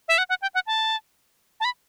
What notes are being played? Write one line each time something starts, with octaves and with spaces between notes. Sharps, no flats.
E5
F#5
F#5
G5
F#5
A5
A5
B5